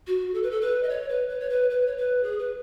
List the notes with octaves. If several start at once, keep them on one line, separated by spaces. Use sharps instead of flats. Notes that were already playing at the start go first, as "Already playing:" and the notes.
F#4
A4
B4
A4
B4
D#5
C#5
B4
B4
C#5
B4
B4
C#5
B4
G#4
B4